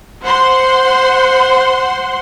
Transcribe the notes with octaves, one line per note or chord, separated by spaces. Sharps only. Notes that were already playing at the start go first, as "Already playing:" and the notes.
C5 F#5 C6